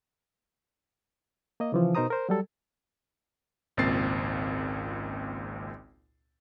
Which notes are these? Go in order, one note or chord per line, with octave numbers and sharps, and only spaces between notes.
A#3 D#5
C#3 E3 F3
B2 D#4 A#4 C5 A#5 D#6
A#4 C5
F#3 G3 A4
G#1 C#2 A#2 C4 A6 C7